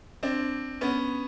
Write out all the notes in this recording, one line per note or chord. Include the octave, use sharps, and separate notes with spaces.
C4 D4
B3 C#4